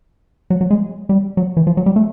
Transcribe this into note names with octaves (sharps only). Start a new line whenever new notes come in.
F#3
F#3
G#3
G3
F#3
E3
F3
F#3
G3
A3